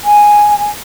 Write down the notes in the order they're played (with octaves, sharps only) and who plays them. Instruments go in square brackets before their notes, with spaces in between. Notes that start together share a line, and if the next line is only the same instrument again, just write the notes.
[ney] G#5